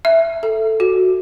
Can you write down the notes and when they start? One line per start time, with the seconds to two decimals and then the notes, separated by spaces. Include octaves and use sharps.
0.05 E5
0.43 A4
0.80 F#4